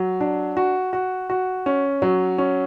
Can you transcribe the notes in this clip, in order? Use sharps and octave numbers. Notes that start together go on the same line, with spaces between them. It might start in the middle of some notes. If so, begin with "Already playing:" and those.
Already playing: F#3
D4
F#4
F#4
F#4
C#4
F#3
C#4